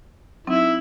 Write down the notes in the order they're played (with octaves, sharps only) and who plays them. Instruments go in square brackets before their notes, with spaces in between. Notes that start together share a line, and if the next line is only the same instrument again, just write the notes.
[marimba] F#3 C4 D#4 [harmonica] E4